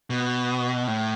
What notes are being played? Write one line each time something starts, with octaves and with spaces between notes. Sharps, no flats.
B2
A2